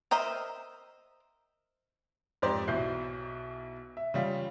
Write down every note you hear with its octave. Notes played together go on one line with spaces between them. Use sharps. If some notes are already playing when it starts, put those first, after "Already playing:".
A#4 C5 D#5 E5
F2 G#2 G4 C5 D5
B1 B2 E4 G6 C7
E5
C#3 G3 F4